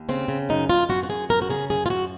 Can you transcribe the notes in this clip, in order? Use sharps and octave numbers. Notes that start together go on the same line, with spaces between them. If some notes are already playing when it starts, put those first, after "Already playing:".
Already playing: D#2
C#3 C4
C#3
F#2 D#4
F#2 F4
F#2 F#4
F#4
F#2 G#4
F#2 A#4
F#4
C#3 G#4
F#2 G#4
F4
F#2 F#4